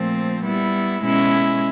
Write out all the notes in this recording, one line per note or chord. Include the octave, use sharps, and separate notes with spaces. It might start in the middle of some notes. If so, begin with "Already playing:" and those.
Already playing: A#2 F3 A3 C4
G3 B3 E4
B2 G#3 C#4 E4